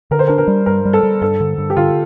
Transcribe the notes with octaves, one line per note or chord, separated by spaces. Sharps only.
D3 A#4
C5
D4 A#4
A#4
G3
G2 A#4
G3
A4
G3
G2 A4
D3
G2
G4
D3 F4